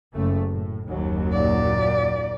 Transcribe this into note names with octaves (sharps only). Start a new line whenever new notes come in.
F#1 A3
A2
F#1 D#2 F#3
A#2 D5